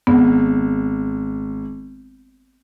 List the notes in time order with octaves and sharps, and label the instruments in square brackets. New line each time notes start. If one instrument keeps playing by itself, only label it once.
[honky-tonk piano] G#1 [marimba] B3